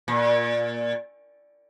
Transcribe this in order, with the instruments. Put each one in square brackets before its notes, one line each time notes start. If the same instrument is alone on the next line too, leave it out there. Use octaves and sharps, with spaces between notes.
[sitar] A#2